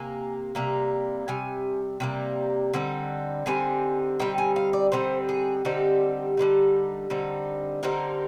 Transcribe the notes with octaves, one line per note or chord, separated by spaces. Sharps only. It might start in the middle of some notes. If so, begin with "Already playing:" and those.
Already playing: C3 A#3 G#5
C3 G3 A#3 A#5
C3 G3 G#5
C3 G3 A#3
D3 G3 C4 D#4
D3 G3 C4 D#4 G#5
D3 G3 C4 D#4 G5
G#5
F5
D5
D3 G3 C4 D#4 C5
G#4
D3 G3 C4 D#4 G4
D3 G3 C4 D#4
D3 G3 C4 D#4
D3 G3 C4 D#4 A#4